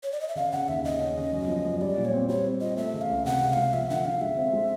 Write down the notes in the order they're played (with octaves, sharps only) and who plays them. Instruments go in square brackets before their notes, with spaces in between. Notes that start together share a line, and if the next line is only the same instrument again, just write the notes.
[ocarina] C#5
D5
D#5
E5
[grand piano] C#3 [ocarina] F5
[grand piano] C#3 [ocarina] F#5
[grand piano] D#2 [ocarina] E5
[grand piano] C#3 [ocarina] D#5
[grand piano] C#4
C#3
F#2
F3
F#2
[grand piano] G3 [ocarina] D5
[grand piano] A#2
[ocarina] C#5
[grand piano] C4
[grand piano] G3 [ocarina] C#5
[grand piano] C4
[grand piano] F4 [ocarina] D#5
[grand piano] A3 [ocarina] E5
[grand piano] C#3
[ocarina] F5
[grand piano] C#2
[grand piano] C3 [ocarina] F#5
[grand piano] C3
[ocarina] F#5
[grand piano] G#3 [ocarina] F5
[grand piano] F3 [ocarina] E5
[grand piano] D3 [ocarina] F#5
[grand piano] D3 [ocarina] F5
[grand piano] G#3 [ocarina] E5
[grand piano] C4
G#3